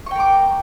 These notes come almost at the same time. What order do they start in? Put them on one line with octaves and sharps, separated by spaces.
C#6 G5 A#4 D6